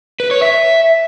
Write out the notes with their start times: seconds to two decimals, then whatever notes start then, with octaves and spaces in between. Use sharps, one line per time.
0.20 B4
0.31 C#5
0.42 E5